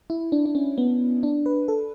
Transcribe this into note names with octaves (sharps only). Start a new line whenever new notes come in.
E4
D4
D4
C#4
B3
D4
B4
A4